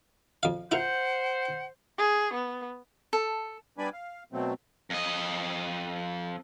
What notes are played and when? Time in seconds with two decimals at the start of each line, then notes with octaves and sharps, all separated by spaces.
0.43 F2 F5
0.71 E4 F4 A#4 C5 F#5
1.99 G#4
2.34 B3
3.13 A4
3.78 G3 B3 D4 D5 G#5 B5
3.93 F5
4.32 B2 F#3 A3 C4
4.90 F2 D#5